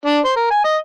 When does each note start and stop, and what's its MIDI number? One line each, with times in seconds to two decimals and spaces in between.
0.06 0.19 62
0.25 0.32 72
0.37 0.49 70
0.51 0.63 80
0.64 0.77 75